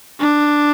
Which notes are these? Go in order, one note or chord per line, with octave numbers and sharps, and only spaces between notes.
D4